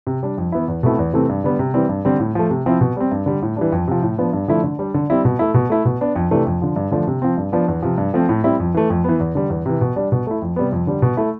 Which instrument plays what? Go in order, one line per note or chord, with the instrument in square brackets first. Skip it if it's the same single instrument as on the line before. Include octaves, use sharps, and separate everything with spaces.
[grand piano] C3
G3 D4
F2
E3 B3 E4
E2
B2 A3 C4 E4
E2
C3 E3 A3 C4
G2
D3 G3 B3
C3
E3 G3 C4
G2
D3 G3 C4
A2
F3 A3
C3
F3 C4 E4
B2
G3 C4
G2
D3 G3
A2
E3 G3 D4
F2
C3 F3
A2
F3 B3 D4
G2
D3 F3 A3 E4
D3
G3 D4
D3
G3 C4 E4
B2
A3 E4
B2
A3 E4
B2
B3 D4
F2
C3 E3 A3 D4
F2
D3 F3
G2
D3 F3 A3 D4
C3
F3 C4
G2
F3 B3 D4
E2
C3 F3
G2
F3 A3 C4
A2
G3 C4 E4
F2
E3 A3
F2
E3 B3
E2
D3 G3
E2
C3 E3
B2
G3 D4
B2
A3 E4
F2
C3 G3 B3
F2
D3 G3
B2
A3 E4